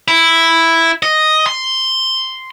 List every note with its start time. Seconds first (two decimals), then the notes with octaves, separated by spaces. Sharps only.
0.08 E4
1.03 D#5
1.47 C6